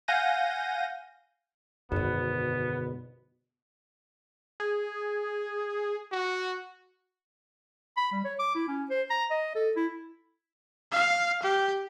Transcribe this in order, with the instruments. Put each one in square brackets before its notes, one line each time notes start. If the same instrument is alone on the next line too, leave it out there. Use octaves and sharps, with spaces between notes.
[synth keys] F5 F#5 G#5 G6 A#6 D#7
[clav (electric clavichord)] G#1 A5 [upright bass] F#2 D3 [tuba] B2 [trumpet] B3
[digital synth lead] G#4
[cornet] F#4
[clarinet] B5
G3
C#5
D6
E4
C#4
C5
A#5
D#5
A4
E4
[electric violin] F5
G4